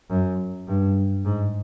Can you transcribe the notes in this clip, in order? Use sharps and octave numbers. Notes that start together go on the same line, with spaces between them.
F#2
G2
G#2